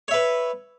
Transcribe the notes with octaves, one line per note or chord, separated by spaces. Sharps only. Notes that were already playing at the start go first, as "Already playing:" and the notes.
B4 C#5 E5